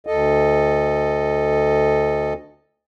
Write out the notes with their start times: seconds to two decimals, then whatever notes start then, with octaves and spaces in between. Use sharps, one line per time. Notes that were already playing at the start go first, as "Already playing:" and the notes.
0.07 D2 A4 D#5